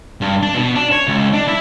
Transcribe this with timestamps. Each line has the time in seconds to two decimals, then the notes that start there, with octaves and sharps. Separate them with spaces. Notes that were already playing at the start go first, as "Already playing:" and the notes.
0.21 G2
0.43 D4
0.55 B2
0.75 D4
0.92 C#5
1.08 C#2
1.33 D4
1.48 E4